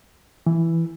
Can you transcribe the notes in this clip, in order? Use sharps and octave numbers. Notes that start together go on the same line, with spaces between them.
E3